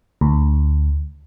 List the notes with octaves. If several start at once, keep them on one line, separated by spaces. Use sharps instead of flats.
D2